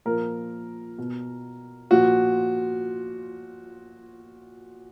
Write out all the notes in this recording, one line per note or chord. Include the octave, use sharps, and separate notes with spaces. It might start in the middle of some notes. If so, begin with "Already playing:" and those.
A#2 F3 A#4
B2
A#2 F3 F#4